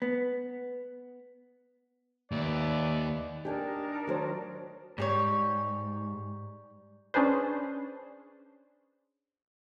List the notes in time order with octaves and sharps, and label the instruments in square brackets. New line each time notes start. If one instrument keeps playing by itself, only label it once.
[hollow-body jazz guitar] B3
[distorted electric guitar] D#2 [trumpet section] B4 D5 E5
[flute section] D4 D#4 A#4 [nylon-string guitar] G4 G5 G#5
[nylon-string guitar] D#3 F#3 C5
[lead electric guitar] G#2 [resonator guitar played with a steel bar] G3 G4 C#5
[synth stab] C#4 D4 G#4 B4 C5